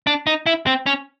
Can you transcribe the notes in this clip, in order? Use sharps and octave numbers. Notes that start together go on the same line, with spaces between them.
D4
D#4
E4
C4
C#4